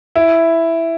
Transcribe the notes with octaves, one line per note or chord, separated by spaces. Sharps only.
E4